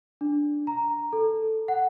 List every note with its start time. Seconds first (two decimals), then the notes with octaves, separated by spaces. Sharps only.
0.21 D4
0.67 A#5
1.13 A4
1.68 F#5